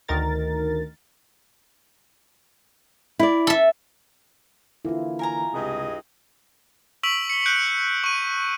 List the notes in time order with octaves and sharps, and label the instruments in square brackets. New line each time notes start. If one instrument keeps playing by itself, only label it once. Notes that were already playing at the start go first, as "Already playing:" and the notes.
[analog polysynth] D2 D#3 A#4 A6
[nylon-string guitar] E4 D5
[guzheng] A4 E5
[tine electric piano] D3 E3 A#3 [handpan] E4 F4
[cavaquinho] A#4 G#5 A#5
[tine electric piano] C#2 C3 [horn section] G2 G#4 D#5
[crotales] C#6 E6 B6 D7 F7 F#7
C#7 G7
F#6 G6 C#7 D7
C#6 D#7